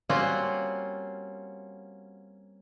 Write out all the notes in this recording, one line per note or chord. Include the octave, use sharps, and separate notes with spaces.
G3 A#3 C4 C#4 F4 F#4